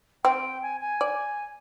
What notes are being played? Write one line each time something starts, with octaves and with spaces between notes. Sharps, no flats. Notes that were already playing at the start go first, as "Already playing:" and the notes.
C4 G5
G#5
G#5
D5